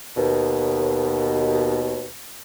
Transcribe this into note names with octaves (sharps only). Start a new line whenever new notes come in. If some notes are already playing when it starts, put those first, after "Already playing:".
D#2 B2